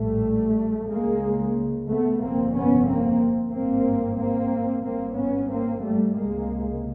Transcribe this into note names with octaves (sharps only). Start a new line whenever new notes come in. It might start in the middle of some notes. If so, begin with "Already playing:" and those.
Already playing: A#1 A2 G3 A3
C#2 C#3 G#3 A#3
A3 B3
G1 F2 C3 A#3 C4
B3 C#4
A#3 C4
G#1 G2 A#3 C4
A#3 C4
G#1 G2 A#3 C4
B3 C#4
A#3 C4
G3 A3
C#2 C3 G#3 A#3